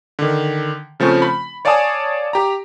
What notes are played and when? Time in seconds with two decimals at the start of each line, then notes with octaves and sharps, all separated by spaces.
0.19 D3 D#3
1.00 C#3 F3 A3 C4 C#4
1.22 B5
1.65 C#5 D5 F5 G#5 A5 D#6
2.33 G4 A#5